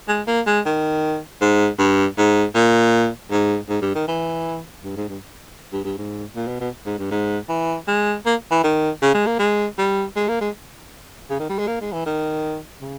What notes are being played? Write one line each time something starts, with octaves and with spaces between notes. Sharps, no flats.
G#3
A#3
G#3
D#3
G#2
G2
G#2
A#2
G#2
G#2
G2
D#3
E3
G2
G#2
G2
G2
G2
G#2
A#2
B2
B2
G#2
G2
G#2
E3
G#3
A#3
E3
D#3
C#3
G#3
A#3
G#3
G3
G#3
A#3
G#3
C#3
D#3
G3
G#3
A#3
G#3
E3
D#3
C#3